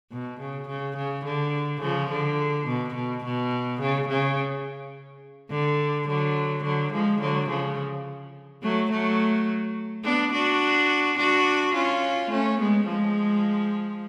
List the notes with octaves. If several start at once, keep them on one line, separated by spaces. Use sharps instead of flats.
B2
C#3
C#3
C#3
D3
C#3 F3
D3
B2
B2
B2
C#3
C#3
D3
D3 F#3
D3 F#3
F3 G#3
D3 F#3
C#3 F3
F#3 A3
F#3 A3
B3 D4
D4 F#4
D4 F#4
C#4 F4
A3 C#4
G#3 B3
F3 G#3